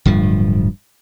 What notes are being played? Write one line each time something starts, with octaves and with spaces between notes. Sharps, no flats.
D1 G2 F3